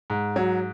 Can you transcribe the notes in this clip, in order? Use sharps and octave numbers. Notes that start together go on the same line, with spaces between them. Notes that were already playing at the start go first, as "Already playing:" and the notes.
G#2
F#3